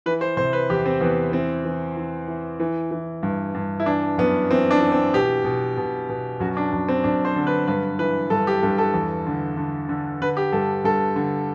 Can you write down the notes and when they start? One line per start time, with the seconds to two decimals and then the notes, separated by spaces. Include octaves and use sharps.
0.06 E3 B4
0.21 C5
0.37 C3 C5
0.53 B4
0.70 E2 G4
0.86 C4
1.01 E2 B3
1.32 E3 C4
1.65 E3
1.97 E3
2.28 E3
2.60 E3
2.91 E3
3.23 G2
3.55 G2
3.80 E4
3.86 E3 D4
4.18 F#2 B3
4.50 E3 C4
4.71 D4
4.81 E3
4.92 C4
5.14 B2 G4
5.45 B2
5.77 B2
6.09 B2
6.40 F#2 F#4
6.57 D4
6.72 F#2
6.88 C4
7.04 F#2 D4
7.25 C5
7.36 D3
7.47 B4
7.67 G2 B4
7.99 E3 B4
8.30 G2 A4
8.47 G4
8.63 G2 A4
8.78 A4
8.94 E2
9.27 D3
9.57 D3
9.89 D3
10.21 D3 B4
10.37 G4
10.52 G2 A4
10.84 G2 A4
11.16 D3